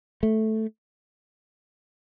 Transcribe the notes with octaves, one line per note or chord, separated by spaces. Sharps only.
A3